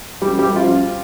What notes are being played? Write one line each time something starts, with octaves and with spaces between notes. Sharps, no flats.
G3 G4
G3 G4
F3 F4